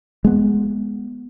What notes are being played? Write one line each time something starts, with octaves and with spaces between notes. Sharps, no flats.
G#3 B3